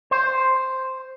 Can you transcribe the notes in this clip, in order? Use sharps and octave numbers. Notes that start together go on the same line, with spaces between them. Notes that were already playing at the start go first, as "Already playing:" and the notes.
C5